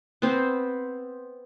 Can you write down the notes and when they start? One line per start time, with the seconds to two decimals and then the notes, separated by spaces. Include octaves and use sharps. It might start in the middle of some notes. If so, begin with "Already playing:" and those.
0.22 B3 C4 C5